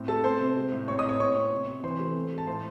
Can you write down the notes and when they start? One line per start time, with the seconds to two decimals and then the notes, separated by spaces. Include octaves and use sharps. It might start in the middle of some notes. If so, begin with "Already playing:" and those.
Already playing: A2 C4
0.08 A3 A4 A5
0.24 C4 C5 C6
0.40 C3
0.56 G#3
0.72 A2
0.88 C4 C#5 C#6
0.98 D#5 D#6
1.04 A2
1.09 C#5 C#6
1.19 C4 C#5 C#6
1.36 C4
1.52 C3
1.68 C3
1.84 E3 C5 C6
1.99 A3
2.15 C4
2.32 G#3
2.38 A5
2.47 A2 C5 C6